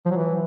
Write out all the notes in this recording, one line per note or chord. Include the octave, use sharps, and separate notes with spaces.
F3
F#3
E3